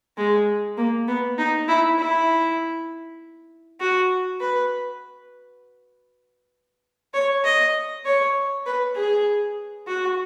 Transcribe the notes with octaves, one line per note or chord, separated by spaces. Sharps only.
G#3
A#3
B3
D#4
E4
E4
F#4
B4
C#5
D#5
C#5
B4
G#4
F#4